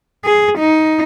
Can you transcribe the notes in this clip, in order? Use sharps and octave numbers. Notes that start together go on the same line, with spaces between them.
G#4
D#4